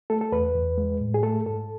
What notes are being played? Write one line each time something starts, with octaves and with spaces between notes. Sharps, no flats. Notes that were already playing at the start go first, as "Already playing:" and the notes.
A3 A4
A4
E2 B4
E2
G#3
A2
G#4
A3 A4
G#2 A4